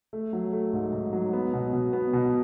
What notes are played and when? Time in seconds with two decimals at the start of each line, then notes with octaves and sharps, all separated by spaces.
0.13 A3
0.33 F#3
0.53 A3
0.73 G#2
0.93 G#2
1.13 F#3
1.33 B3
1.53 B2
1.73 B2
1.93 B3
2.13 B2